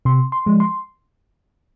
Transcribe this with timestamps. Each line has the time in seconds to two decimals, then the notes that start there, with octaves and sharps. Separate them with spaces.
0.05 C3 C6
0.32 C6
0.46 F3 G#3
0.60 C6